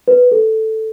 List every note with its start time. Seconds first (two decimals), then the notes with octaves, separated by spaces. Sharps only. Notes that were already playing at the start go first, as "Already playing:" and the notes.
0.08 B4
0.31 A4